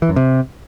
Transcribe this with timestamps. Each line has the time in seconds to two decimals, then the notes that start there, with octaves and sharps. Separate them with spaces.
0.02 E3
0.09 F#2
0.16 C3